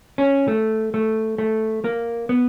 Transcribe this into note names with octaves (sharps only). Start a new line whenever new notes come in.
C#4
A3
A3
A3
A#3
B3